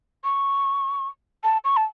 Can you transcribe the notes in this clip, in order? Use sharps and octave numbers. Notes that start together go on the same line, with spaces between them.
C#6
A5
C#6
A5